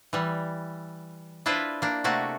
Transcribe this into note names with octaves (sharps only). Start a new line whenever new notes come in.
E3 G3
D4 E4 F4 B4 C5
A#3 D4
C3 A3 A#3 F#4 A5